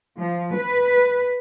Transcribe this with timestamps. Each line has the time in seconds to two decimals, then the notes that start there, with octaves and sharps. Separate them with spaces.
0.19 F3
0.55 B4